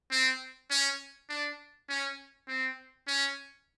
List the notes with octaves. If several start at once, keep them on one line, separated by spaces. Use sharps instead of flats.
C4
C#4
D4
C#4
C4
C#4